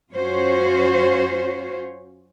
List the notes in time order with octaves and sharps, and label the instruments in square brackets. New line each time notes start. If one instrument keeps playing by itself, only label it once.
[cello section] F#2 C#4 F4 F#4 C5 C#5